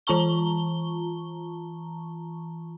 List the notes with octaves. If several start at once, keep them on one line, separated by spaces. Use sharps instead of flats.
E3 F4 A5 A#5 C#6 G7